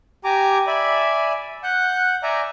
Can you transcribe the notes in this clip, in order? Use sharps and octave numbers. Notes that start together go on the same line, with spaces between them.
G4 G#5 A#5 D6
D5 E5 G#5 B5
F#5 F#6 G6
D5 E5 G#5 A#5